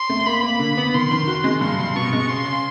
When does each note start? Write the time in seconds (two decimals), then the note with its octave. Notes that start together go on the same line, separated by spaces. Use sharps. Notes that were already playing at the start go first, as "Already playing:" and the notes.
Already playing: C6
0.10 A3
0.26 A#3 B5
0.43 A#3
0.59 D3
0.77 B3
0.94 D#3 C6
1.11 D#3
1.27 F#4
1.44 G#3
1.61 G2 C6
1.79 G2
1.96 B2 C#6
2.13 G#3
2.29 C#3 C6
2.46 C#3